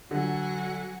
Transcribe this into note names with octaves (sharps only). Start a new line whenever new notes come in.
D3 F#3 F#5 G#5